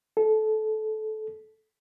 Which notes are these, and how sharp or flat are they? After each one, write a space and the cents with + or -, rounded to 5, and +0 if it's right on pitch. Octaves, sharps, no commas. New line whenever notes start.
A4 -20